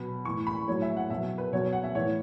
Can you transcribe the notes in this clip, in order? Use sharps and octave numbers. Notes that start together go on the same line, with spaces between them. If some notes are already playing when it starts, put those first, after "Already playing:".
Already playing: B2 F#3 B5
A2 E3 C#6
B5
A2 F#3 C#5
E5
F#5
B2 F#3 E5
B4
B2 F#3 C#5
F#5
E5
A2 E3 C#5